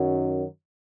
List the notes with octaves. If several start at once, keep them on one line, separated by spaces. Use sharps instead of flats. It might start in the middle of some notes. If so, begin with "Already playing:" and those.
Already playing: F#2 D#3 F#3